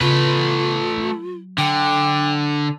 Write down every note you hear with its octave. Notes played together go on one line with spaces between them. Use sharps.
C#3 A3 B3 F4 B4
F#3
D3 G5